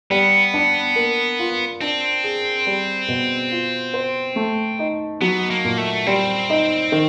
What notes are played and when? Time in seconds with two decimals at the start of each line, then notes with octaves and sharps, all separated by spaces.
0.10 G3 B3
0.54 D4
0.96 A#3
1.39 F4
1.81 C4 D4
2.24 G#4
2.67 G3
3.08 B2
3.51 F4
3.94 C5
4.36 A3
4.79 D#4
5.21 F#3 B3
5.50 A#3
5.64 A#2
5.78 A3
6.07 G3 C4
6.50 D#4
6.92 D#3